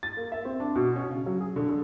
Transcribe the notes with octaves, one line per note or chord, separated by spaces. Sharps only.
A6
A#3
E5
C4
D4
B2
C#4
C#3
F#3
G#4
D3
D3